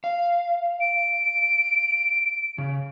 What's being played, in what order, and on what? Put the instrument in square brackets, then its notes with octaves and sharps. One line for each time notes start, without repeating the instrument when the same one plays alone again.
[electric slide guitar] F5
[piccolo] D7
[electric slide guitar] C#3